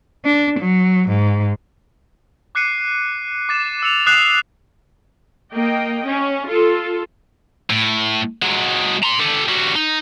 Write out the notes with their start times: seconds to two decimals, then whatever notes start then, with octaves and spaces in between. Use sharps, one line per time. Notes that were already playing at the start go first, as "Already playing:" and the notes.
0.25 D4
0.60 F#3
1.08 G#2
2.55 D6 F#6 C7 C#7 D#7
3.49 D6 A6 E7
3.83 E6 C#7 F7
4.06 D#6 F#6 C7 E7 F7
5.52 A#3 D#5 G5
6.04 C#4
6.48 F4 A4
7.70 A2
8.42 F#3 G#3
9.02 A#5 C6
9.19 G4 A4
9.48 G3 F#4
9.76 D#4